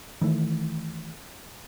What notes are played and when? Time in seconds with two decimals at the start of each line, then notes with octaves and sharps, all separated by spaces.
0.21 D#3 E3 A3